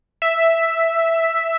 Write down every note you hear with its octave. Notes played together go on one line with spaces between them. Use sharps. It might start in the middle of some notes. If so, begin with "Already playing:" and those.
E5